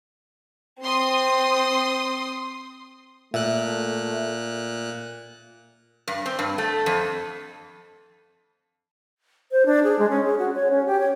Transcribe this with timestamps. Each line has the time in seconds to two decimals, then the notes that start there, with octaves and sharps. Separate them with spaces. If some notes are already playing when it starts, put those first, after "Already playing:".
0.84 C4 C6 D#6
3.34 A#2 A3 E5 F#6
6.08 G2
6.26 C4
6.39 G2
6.58 A3
6.86 F2
9.52 C5
9.66 D4
9.83 G#4
9.99 G#3
10.10 C#4
10.25 G#4
10.39 F#4
10.55 C#5
10.71 C#4
10.87 G4
11.00 C#5